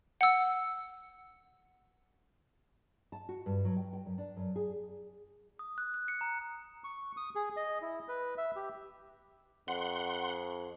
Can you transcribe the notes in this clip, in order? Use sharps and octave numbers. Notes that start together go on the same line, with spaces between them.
F#5 E6
A5
F#4
G2
F#3
G5
G5
F#2
D4
F#2
G#4
D#6
F#6
F#6
C#7
A#5
C#6
D#6
G#4
D#5
E4
B4
E5
G4
F2 F#5 C6